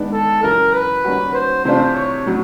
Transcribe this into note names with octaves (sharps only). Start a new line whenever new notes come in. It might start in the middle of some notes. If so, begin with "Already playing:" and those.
Already playing: D#3 G#3 B3 D4
A4
F#2 C#3 E3 A#4
B4
D#3 G3 A#3 C#4 F#4
C5
C3 E3 A3 D4 F4 C5
C#5
A2 F#3